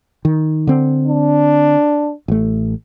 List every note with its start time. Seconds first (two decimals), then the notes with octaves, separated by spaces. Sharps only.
0.25 D#3
0.67 D3 C4
1.08 D4
2.28 A1 A3